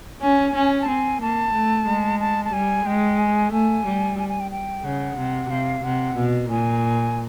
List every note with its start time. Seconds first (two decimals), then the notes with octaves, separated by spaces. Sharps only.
0.21 C#4 G#5
0.55 C#4
0.81 A5
0.88 C4 G#5
1.21 A#3 A5
1.53 A3
1.87 G#3
2.20 A5
2.45 A5
2.53 G3 G#5
2.86 G#3 G5
3.19 G#5
3.52 A3 G#5
3.86 G3
4.19 G#5
4.29 G#5
4.40 G5
4.51 G5
4.84 C#3 F#5
5.17 C3
5.50 C3 F5
5.84 C3 F#5
6.16 B2
6.50 A#2 G#5